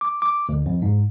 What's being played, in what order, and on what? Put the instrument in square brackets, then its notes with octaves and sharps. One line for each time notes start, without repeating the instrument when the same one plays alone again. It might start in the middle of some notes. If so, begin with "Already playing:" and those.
[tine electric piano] D6
D6
D2
F2
G#2